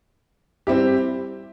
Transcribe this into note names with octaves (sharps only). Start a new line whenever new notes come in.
G3 C4 E4 G4